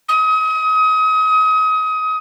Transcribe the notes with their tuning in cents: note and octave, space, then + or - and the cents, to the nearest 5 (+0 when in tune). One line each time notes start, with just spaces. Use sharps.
D#6 +30